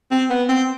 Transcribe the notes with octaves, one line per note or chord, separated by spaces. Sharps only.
C4
B3
C4